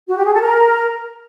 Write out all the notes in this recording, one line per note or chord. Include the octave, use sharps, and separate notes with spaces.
F#4
G4
G#4
A4
A#4